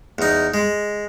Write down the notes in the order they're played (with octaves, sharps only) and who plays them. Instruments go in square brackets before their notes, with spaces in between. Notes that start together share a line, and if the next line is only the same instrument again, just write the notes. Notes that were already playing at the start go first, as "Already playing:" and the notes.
[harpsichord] E2 D#4
G#3